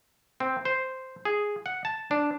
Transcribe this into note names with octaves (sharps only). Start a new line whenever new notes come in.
C4
C5
G#4
F#5
A5
D4